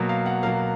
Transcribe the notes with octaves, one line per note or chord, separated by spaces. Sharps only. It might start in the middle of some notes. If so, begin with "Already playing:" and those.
Already playing: B2 F#3 A#3
F5
F#5
B2 F#3 A#3 F5